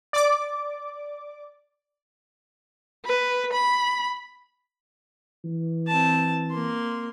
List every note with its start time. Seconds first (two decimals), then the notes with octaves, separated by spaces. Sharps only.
0.13 D5 D6
3.05 B4
3.53 B5
5.45 E3
5.87 C4 A5
6.51 A#3 C6